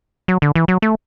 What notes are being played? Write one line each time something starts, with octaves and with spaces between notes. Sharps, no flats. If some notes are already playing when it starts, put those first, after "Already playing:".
F#3
D3
E3
F#3
A3